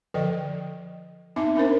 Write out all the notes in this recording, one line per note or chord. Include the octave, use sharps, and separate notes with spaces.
D3 F3 A4 D#5 G5
B3 C4 D#4 E5 D6
C#4 D4 A#4 C5